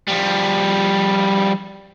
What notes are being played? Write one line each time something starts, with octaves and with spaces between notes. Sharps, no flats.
F3 G3